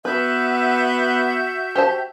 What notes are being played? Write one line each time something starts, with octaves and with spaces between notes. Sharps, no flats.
B3 F#4 B4 E5 G6
G4 C5 A5